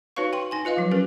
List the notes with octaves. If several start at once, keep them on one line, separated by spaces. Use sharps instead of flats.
D#4 F#4 B4 C#5 F5 C#6
G5 C6
D#4 G#5 C6
F4 B4 D#5 F5
F3 F#3
C#4 G4 A#4 B4